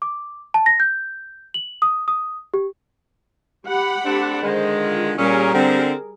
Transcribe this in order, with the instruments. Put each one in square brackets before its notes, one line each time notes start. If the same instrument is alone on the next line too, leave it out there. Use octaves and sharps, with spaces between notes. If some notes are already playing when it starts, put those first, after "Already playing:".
[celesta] D6
A5
A#6
G6
F#7
D#6
D#6
G4
[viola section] G4 F#5 B5
[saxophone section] A3 C4 D4
[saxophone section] D3 D#3 G#3 [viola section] C5
[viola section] F4
[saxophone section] A#2 C#4 [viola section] G3 G#4 A#4
[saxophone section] D3 C4